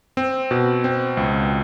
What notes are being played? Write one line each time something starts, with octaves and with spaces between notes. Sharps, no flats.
C4
B2
C4
C#2